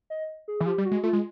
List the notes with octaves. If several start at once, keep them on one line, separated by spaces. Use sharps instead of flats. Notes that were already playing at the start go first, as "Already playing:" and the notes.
D#5
G#4
E3
F3 G4
G3
F#4
G#3
A3 F4
G#3